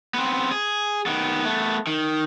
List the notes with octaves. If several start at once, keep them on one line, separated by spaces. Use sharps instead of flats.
B3 C4
G#4
D#3 B3
A3 B3
D#3